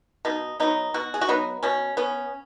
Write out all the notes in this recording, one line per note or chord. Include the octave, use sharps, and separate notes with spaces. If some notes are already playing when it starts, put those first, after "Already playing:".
B2 D#4
F#3 B3 D#4
B2 F#4
G#4
F#4
F#3 B3 D#4
B2 C#4
B3 C#4